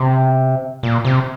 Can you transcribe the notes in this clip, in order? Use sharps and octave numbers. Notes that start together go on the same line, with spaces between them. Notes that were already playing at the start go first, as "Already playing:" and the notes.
Already playing: C3
A#2
C3